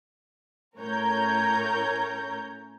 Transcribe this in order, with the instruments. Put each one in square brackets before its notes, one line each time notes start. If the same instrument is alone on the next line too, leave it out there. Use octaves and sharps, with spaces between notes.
[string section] A2 C#4 A#4 C#5 A#5 G6